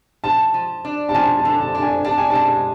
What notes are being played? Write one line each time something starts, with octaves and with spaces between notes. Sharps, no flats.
F3 A5
F3
D4
A5
F3 G#5
A5
D3
A5
D4
G#5
D4 A5
G#5
A5
G#3